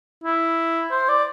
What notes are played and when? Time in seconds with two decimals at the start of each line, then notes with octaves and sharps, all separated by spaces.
0.24 E4
0.91 C5
1.09 D5